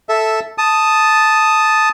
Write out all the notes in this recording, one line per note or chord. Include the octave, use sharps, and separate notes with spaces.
A4 E5
A5 D#6